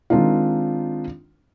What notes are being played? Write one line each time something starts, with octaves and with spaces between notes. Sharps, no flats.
D#3 G#3 C4 D4 D#4 F4